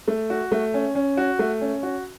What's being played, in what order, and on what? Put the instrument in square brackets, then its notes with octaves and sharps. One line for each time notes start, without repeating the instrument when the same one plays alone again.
[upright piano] A3
F#4
A3
C#4
C#4
F#4
A3
C#4
F#4